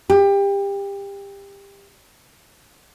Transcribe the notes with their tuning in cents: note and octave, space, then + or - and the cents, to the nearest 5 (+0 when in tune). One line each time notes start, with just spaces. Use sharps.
G4 +25